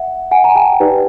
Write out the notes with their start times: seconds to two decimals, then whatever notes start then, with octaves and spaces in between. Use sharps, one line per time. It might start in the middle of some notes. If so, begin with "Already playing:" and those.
Already playing: E5 F#5
0.31 F#5 G#5
0.44 A#5
0.55 G5 A5
0.80 D#4 G4 B4 D5